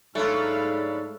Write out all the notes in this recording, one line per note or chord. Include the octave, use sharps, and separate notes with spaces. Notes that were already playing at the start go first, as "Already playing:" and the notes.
G#2 F#3 A3 D4 F4 A4 F5 B5